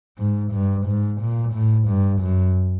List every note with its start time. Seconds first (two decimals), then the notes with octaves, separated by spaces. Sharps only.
0.18 G#2
0.52 G2
0.87 G#2
1.21 A#2
1.54 A2
1.88 G2
2.21 F#2